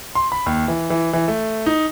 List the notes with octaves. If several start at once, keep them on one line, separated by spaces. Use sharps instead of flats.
C6
B5
D#2
E3
E3
E3
A3
D#4